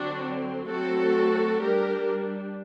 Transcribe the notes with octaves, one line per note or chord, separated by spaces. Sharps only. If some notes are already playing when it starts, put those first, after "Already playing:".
Already playing: D3 F#3 C4 D4 F#4
F#3 A3 C4 F#4 A4
G3 D4 G4 A#4